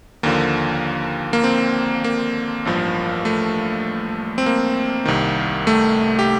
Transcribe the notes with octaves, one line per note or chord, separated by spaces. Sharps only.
D#2 D3 F3 A#3
A#3
C4
A#3
A1 G2 F3
A3
C4
A#3
C2 C3 D#3
A3
G4